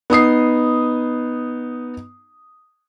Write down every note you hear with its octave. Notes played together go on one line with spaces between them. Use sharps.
B3 D#4 D#6 C7